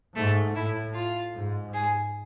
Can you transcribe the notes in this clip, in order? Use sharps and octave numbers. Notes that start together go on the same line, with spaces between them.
G#2 A3
A2 E4
F4
G#2
G#4